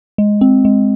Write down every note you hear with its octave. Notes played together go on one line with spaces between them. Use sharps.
G#3
C4
G#3